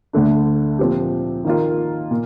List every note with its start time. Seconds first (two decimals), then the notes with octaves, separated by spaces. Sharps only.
0.13 D2 D3 A3 D4
0.79 A#2 F3 C4 G4
1.45 D#3 A#3 F4
2.11 A#2